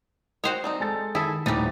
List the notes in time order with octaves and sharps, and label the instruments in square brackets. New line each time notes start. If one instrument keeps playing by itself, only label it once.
[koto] F#4 C5 C#5 [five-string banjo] D#5 F#5 G5
[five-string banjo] G3 C4 D#4
[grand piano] G#3 A4 A6
[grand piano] D#3 [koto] E4 [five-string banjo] G#4 A4
[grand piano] D#1 A2 A6 [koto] G3 D#4 [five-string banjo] B3 E4